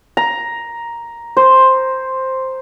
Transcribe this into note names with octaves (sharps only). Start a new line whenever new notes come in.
A#5
C5